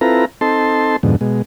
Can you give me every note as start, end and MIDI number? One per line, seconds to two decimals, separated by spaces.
0.01 0.25 60
0.01 0.25 64
0.01 0.25 65
0.01 0.25 69
0.01 0.25 71
0.01 0.25 82
0.41 0.96 60
0.41 0.96 63
0.41 0.96 69
0.41 0.96 81
0.41 0.96 84
1.03 1.16 41
1.03 1.16 44
1.03 1.16 47
1.03 1.16 50
1.21 1.42 47
1.21 1.42 56